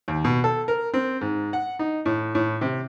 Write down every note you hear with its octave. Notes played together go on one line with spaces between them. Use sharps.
D#2
B2
A4
A#4
C4
G#2
F#5
D#4
A2
A2
C3